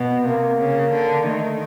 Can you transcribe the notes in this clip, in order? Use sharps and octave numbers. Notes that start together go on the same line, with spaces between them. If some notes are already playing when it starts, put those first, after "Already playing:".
Already playing: B2 B3
C3 A#3
C#3
D3
D#3 A3